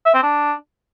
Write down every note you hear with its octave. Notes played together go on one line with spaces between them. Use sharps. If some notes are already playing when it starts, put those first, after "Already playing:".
E5
C4
D4